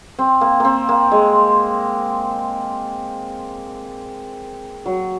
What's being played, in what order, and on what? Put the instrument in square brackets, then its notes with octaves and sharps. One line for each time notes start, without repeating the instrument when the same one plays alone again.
[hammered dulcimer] C4
A#3
A#3 C4
A#3
G#3
F#3